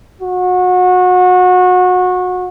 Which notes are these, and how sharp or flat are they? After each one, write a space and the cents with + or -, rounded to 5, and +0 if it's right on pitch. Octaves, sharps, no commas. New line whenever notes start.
F#4 -25